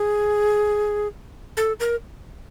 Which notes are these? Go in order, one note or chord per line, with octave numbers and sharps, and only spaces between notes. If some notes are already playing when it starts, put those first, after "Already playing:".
Already playing: G#4
A4
A#4